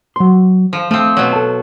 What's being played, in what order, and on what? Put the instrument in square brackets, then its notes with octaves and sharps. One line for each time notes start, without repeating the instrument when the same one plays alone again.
[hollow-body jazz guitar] F#3 C6
[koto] F3
[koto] F3 C4 [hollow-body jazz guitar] A3
[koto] B2 F#3
[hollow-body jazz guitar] A4 G5 A5